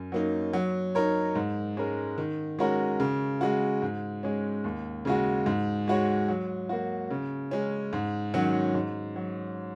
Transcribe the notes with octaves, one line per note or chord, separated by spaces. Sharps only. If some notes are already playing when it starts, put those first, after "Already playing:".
Already playing: F#2
F#3 A#3 D#4
F#3
D#4 A#4 C#5
G#2
G#3 C#4 A#4
D#3
G#3 C#4 F#4 A#4
C#3
G#3 F#4
G#2
G#3 C#4
D#2
C#3 G#3 F#4
G#2
G#3 F#4 C#5
F#3
A#3 F#4
C#3
G#3 C#4
G#2
D#3 F#3 C#4 F#4
G#2
F#3